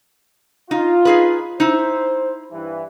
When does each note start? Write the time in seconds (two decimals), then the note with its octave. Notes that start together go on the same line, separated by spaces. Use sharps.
0.71 D#4 F4
1.05 D#4 G#4 B4
1.60 D#4 E4 C5
2.51 G2 E3